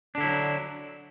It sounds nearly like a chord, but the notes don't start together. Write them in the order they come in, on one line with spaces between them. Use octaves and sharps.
D4 D3 E4 F#3